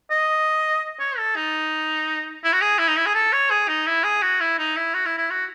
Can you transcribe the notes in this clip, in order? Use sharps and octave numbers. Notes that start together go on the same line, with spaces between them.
D#5
C#5
A4
D#4
E4
F#4
G#4
E4
D#4
E4
G#4
A4
C#5
G#4
D#4
E4
G#4
F#4
E4
D#4
E4
F#4
E4
E4
F#4